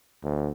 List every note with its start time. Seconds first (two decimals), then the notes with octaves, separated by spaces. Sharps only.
0.23 D2